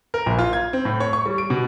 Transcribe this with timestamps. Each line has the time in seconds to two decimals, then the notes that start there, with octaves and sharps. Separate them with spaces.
0.14 A#4
0.26 A#1
0.39 F4
0.53 G#6
0.73 C4
0.85 A2
1.00 C#5
1.13 C#6
1.26 G3
1.38 D7
1.50 B2